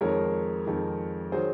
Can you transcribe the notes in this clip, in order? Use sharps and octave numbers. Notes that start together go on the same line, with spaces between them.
F2 D#3 G#3 A#4 C#5
F2 D#3 G#3
D#3 F#3 G#4 C5